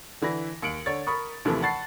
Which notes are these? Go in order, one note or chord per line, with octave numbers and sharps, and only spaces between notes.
D3 E3 B5 A#6
D#2 C#7 D7 F#7
D3 C#5 A6
A#4 B5 C#6 D#6
D#2 C3 E3 F3 A3
F#5 A5 B5 C#6 A6 C7